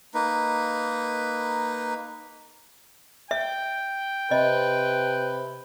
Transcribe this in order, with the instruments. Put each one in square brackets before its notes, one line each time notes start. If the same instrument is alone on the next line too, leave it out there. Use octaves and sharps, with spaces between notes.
[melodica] A#3 D#4 B4
[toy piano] E5 [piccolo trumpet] G5
[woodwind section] C3 [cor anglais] B4 [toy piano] D#5